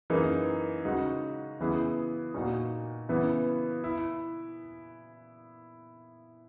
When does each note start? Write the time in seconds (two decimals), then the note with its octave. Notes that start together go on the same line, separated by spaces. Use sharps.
0.10 F#2 E3 A#3 D#4 G#4
0.85 C#3 G#3 D#4 F#4
1.59 C#3 E3 B3 E4 G#4
2.34 A#2 A#3 D#4 F#4
3.09 C#3 E3 B3 E4
3.84 E4